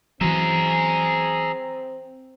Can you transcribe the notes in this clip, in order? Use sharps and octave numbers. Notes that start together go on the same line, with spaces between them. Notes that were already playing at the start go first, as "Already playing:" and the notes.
E3 F#3 C4 G#4 E5 A#5